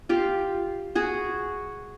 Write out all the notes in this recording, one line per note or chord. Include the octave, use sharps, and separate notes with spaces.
F4 G4
F#4 G#4